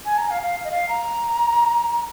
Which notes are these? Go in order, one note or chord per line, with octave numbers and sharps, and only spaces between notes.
G#5
A#5
F5
F5
D#5
F5
A#5